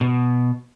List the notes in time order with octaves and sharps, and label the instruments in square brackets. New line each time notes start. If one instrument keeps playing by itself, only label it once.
[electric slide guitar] B2